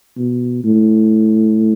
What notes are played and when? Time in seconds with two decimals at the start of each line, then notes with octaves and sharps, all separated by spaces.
0.17 B2
0.64 A2